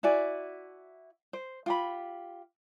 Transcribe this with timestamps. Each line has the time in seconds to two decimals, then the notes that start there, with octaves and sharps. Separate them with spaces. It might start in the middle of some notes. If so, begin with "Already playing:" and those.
0.03 E4 F#4 D5 G#5
1.33 C5
1.66 F4 G4 B5